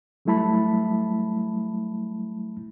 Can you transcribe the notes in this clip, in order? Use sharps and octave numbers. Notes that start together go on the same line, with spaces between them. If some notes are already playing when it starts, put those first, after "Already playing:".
F#3 G3 A3 E4 A5 B5